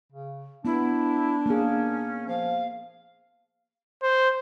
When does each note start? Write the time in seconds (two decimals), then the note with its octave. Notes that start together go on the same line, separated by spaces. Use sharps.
0.12 C#3
0.65 B3 D4 E4
1.46 A#3 C#4 G#4
2.27 F3 F5
4.02 C5